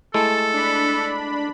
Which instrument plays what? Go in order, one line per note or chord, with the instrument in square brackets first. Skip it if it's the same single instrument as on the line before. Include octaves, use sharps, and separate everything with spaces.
[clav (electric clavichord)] G#3 A3 E4 [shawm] A4 [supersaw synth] A5
[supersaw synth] D4 B5